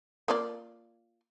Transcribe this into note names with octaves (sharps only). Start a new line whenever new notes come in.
A#3 F4 D5